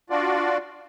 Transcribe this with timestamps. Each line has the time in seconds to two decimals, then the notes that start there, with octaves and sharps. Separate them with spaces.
0.10 D4 F4 F#4 D5